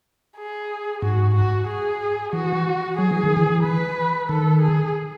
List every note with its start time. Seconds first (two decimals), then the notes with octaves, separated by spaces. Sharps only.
0.38 G#4
1.02 G#2 F#4
1.35 F#4
1.68 G#4
2.33 E3 F#4
2.98 F#3 G#4
3.11 E3
3.24 D#3
3.37 E3
3.63 B4
4.29 D#3 A4
4.62 G#4